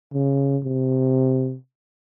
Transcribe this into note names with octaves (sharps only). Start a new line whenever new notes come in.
C#3
C3